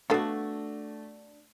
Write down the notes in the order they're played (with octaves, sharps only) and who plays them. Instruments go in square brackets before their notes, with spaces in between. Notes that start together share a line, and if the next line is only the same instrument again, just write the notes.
[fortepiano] A3 [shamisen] B3 A4 F5 [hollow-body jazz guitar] D4 F#4